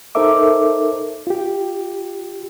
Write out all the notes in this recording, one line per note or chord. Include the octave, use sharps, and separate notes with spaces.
D#4 A4 A#4 C5 E5 D6
F4 G4